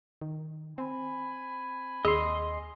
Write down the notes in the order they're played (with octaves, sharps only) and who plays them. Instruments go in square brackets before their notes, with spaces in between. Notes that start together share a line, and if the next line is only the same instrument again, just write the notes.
[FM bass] D#3
[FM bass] C4 [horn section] G#5 B5
[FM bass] D#2 [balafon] G#4 [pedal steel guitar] D#5 C6